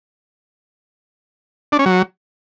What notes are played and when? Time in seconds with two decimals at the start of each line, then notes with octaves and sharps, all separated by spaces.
1.72 D4
1.79 C#4
1.86 F#3